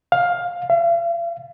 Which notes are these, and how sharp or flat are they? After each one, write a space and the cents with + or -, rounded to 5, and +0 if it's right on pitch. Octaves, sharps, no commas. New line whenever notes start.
F5 +15
F5 -45